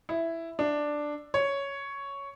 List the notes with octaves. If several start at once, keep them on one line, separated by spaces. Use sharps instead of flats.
E4
D4
C#5